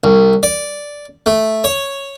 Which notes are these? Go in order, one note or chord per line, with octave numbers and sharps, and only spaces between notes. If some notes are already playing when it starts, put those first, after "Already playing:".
C2
D5
A3
C#5